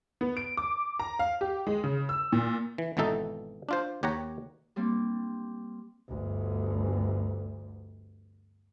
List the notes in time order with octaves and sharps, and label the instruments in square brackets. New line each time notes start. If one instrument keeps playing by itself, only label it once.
[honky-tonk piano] B3
D7
D6
A#5
F5
G4
G#3
C#3
E6
A#2
[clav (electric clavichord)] E3
G#1 B2 E3 D#4 A4
D4 F4 C5
D#2 G4 C#5 F#5 A#5
[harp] G3 A#3 C4 D4
[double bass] G1 D2